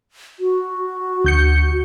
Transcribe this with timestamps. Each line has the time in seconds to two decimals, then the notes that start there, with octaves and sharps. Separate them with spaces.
0.40 F#4
1.25 D2 G6 C#7